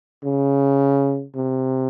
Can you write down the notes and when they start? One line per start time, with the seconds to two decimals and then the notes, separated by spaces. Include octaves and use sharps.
0.24 C#3
1.36 C3